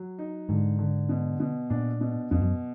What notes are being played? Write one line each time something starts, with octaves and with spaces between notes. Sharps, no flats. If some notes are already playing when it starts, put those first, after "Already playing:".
Already playing: F#3
D#4
G#2 D3
D3
B2
B2
A#2 D4
B2
F2 B2
F#2